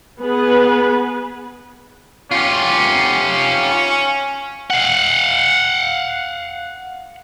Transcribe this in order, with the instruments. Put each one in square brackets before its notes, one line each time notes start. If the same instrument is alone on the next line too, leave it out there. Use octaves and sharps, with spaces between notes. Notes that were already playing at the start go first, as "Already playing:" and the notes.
[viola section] B3 G#4 B4
[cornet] C#4 [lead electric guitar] F4 G4
[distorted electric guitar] F5 F#5